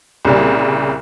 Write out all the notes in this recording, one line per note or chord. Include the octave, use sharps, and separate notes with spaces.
C2 A#2 C#3 G3